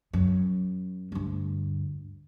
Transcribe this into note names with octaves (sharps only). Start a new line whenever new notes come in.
F#2
D2 G2